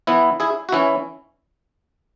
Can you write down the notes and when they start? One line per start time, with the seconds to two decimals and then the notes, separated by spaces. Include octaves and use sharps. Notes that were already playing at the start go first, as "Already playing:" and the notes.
0.07 E3 B3 E4
0.40 E4 G#4
0.69 F#4
0.72 E3 C#4 E4